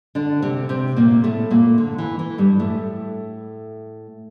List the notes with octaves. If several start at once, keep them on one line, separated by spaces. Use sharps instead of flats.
D3 D4
C3 C4
C3 C4
A#2 A#3
A2 A3
A#2 A#3
D3
E3
E3
G2 G3
A2 A3